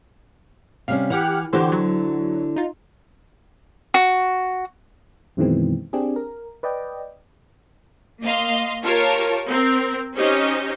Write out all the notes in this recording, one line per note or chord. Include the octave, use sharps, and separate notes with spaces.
C3 G3 C#4 F5
E3 G4 F#5 F6
D3 E3 E4 F#4 G4 C5
F#3
D#4 F4
F#4
F#2 B2 D#3 E3 G#3 C4
C4 D4 G4 G#4
A#4
B4 D5 D#5 G5
A#3 D#5 F5 C6
F4 G4 A#4 C#5 A5 C#6
C4 A#4
C#4 D#4 G4 C5 C#5 D#5